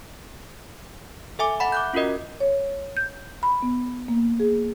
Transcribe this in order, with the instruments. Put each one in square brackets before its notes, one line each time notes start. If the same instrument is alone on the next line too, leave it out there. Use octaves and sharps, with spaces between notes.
[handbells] A4 E5 G#5 D6
E5 F#5 B5
D6 F#6 G6
C#4 F4 F#4 A#4 D#5
[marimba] C#5
G6
B5
B3
A#3
G#4